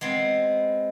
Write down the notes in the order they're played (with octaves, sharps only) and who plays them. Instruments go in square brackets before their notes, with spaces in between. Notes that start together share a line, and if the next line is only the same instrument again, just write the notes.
[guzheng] G#3 B3 C4